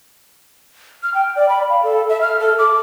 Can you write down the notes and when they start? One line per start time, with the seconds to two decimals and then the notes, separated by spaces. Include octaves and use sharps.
1.03 F6
1.14 G5
1.36 D5
1.49 B5
1.70 F5
1.83 A4
2.09 E5
2.21 F6
2.40 A4
2.59 D6